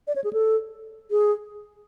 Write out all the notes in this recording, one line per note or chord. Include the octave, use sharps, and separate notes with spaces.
D5
C#5
G#4
A4
G#4